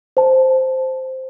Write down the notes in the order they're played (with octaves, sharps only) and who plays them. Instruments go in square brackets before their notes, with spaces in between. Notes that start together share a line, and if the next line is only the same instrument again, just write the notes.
[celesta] C5 A5